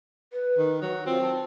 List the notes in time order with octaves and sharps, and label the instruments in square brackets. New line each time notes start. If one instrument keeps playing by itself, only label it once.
[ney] B4
[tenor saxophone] D#3
F#3
[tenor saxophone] C4 [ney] F4
[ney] A5